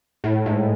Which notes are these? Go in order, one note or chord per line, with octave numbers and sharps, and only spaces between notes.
A2
G#2